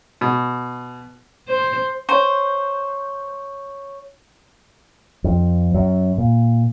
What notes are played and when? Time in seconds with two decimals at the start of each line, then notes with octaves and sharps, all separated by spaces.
0.21 B2
1.48 C5
2.09 C5 C#5 C#6
5.24 F2
5.74 F#2
6.18 A#2